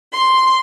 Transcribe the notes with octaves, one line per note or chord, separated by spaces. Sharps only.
C6